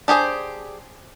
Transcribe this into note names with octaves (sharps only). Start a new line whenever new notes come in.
D4 G4 G#4 C5